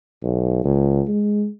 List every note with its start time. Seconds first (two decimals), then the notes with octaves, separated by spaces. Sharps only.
0.23 B1
0.64 C#2
1.08 G#3